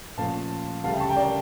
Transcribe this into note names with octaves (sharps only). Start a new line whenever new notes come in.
A#2 F3 A3 C#4 F5 A5
D2 C#3 G3 F5 A5
E5 G5
A5 C#6
G5 A#5
A#4 D5